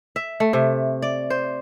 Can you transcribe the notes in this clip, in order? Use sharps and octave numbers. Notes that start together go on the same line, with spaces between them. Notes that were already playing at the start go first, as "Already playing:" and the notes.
E5
A3
C3
D5
C5